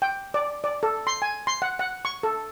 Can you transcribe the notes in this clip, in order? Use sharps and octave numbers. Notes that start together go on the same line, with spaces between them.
G5
D5
D5
A4
C6
G#5
C6
F#5
F#5
C#6
A4